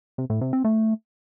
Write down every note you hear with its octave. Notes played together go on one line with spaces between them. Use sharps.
C3
A2
C3
C4
A3